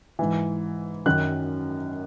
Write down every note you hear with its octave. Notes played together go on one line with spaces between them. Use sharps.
G#2 E3
F#2 D#3 F#6